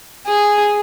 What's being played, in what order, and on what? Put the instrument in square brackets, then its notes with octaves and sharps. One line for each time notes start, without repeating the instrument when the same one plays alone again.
[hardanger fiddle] G#4